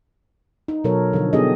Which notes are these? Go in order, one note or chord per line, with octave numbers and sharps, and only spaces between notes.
D#4
B2 F#3 A4 A#4 C#5
D3 F3
B3 D4 D#4 G4 G#4 D#5